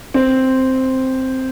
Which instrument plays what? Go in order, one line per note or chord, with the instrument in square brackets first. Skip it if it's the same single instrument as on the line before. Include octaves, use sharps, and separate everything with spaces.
[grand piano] C4